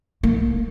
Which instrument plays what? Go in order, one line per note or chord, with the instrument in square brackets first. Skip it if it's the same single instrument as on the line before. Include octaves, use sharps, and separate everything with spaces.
[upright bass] A#3